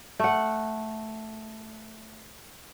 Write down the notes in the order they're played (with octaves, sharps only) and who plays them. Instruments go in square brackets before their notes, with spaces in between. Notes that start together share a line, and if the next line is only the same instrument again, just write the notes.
[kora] A3 F#5